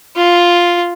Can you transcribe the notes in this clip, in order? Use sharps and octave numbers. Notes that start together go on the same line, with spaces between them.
F4